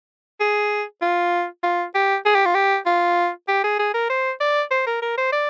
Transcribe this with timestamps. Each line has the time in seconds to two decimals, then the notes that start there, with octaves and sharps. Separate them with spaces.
0.40 G#4
1.02 F4
1.63 F4
1.95 G4
2.26 G#4
2.35 G4
2.45 F4
2.55 G4
2.86 F4
3.48 G4
3.64 G#4
3.79 G#4
3.94 A#4
4.10 C5
4.40 D5
4.71 C5
4.87 A#4
5.02 A#4
5.18 C5
5.33 D5